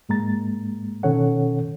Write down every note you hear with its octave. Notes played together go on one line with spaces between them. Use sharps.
G#2 G#3 A#3 A#5 A6
B2 D#3 C#4 A4 C#5 F#5